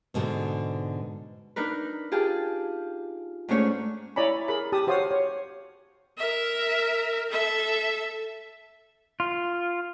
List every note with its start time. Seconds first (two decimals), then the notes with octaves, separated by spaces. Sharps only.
0.14 G#2 B2 D3 G#3 D#4
1.56 D4 D#4 A#4 B4
2.12 F4 G4 G#4 A5
3.48 G#2 A3 C#4 D4 C#5
4.16 E4 C#5 D5 G#5 A#5 B5
4.48 G#4 A#4 B5
4.72 G4 A5 D#6
4.87 F#4 C5 C#5 F5 D#6
5.11 C#5
6.18 A#4 E5
7.29 A4 E5
9.20 F4